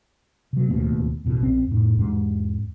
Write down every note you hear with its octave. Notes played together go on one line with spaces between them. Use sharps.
C3 F#3
D1 D#2 B2 A3
A1 E2 B2
A#1 C4
F2 A2
E2 G#2 G#3